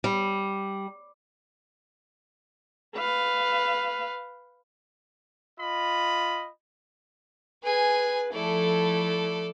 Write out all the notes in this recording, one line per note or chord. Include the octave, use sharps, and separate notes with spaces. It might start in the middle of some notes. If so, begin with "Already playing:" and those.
G3
B4 F5
F4 D#5 B5
G#4 B4 G#5
F3 A3 E4 A4 D5